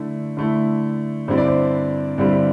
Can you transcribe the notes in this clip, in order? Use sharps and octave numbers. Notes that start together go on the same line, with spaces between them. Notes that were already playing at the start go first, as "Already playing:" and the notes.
Already playing: D3 A3 E4
D3 A3 E4
G2 D3 G3 C4 E4 C5
D5
C5
G2 D3 G3 C4 E4